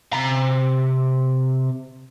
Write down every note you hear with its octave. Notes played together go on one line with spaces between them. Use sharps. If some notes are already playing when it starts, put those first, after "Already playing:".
C3 A#5